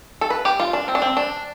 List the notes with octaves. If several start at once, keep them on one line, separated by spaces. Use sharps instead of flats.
A4
B4
G4
F4
D4
C4
D4
C4
D4